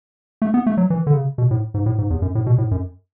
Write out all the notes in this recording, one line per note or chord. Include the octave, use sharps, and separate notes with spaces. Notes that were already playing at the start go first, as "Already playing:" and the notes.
A3
B3
A3
F#3
E3
D3
C#3
B2
A2
G#2
A2
G#2
E2
F#2
A2
B2
A2
F#2